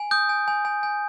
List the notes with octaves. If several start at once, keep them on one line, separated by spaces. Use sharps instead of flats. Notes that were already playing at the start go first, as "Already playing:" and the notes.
Already playing: G#5
D#6 G6
G#5
G#5
G#5
G#5